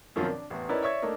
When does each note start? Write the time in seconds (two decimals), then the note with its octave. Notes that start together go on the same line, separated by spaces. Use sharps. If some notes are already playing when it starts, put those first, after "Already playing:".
0.16 F#2 B2 D#3 F3 C4 C#4
0.30 D4
0.50 A1 E2
0.69 C#4 D#4 E4 A#4 B4 D5
0.82 C#5 D5 E5 C#6 E6 G#6
1.02 A3 A#3 D4 D#4 A#4